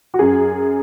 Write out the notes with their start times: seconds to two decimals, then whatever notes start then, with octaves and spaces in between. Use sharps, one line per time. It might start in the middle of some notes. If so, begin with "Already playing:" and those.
0.14 F#4
0.19 F#2 G#4